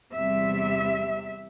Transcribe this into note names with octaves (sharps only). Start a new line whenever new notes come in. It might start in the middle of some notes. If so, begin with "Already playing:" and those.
E2 C3 G3 E5